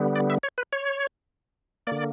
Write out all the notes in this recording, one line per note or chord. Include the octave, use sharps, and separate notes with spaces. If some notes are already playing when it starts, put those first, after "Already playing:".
Already playing: D3 G3 B3
D5
E5
C#5
B4
C#5
D3 A#3 D5